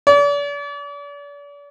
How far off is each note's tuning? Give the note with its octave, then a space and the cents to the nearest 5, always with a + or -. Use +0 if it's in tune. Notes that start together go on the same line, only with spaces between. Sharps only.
D5 -40